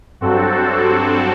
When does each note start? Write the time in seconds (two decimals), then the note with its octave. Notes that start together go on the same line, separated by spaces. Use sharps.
0.21 G2 F#3 C4 F#4 A4